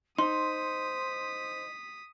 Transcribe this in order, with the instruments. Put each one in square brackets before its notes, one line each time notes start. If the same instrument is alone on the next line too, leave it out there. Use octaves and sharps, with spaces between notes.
[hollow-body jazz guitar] D#4 [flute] C5 [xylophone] C6 [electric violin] D#6 B6